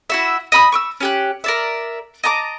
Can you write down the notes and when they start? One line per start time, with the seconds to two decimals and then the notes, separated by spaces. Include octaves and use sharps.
0.10 E4 F#4 E5
0.52 D#5 B5 D#6
0.72 C#6 D6 E6
1.00 C#4 G4 F#6
1.44 A#4 D5 E5
2.24 D#5 A5 A#5 D6